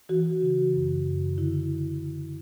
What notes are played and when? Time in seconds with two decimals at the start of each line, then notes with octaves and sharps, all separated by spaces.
0.09 E3 F#4
0.25 E3
0.42 C#3
0.58 E3
0.74 F#2
0.90 C#3
1.06 F#2
1.22 F#2
1.38 D3 E4